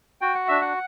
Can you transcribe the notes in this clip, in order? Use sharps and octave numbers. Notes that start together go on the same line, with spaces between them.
F#4 G5
F#5
D4 E5
F#5